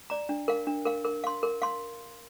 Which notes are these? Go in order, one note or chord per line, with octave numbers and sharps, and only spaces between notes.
D5 A#5
D4
A#4 F5
D4
A#4 F5
A#4
F5 C6
A#4
F5 C6